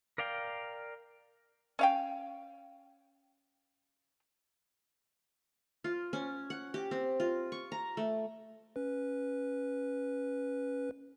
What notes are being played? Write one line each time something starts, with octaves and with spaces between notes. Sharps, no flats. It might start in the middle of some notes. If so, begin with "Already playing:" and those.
A#4 D5 F5 G5
C#4 F5 G5
F4
C#4
F#5
G4
C4
F4
C#6
A#5
A3
C#4 B4